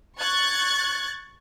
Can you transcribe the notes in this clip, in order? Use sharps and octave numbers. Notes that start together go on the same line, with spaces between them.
C#6 F#6 G#6 A6